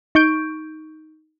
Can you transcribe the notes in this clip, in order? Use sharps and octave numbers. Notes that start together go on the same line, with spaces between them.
D#4 C#6 G6 D7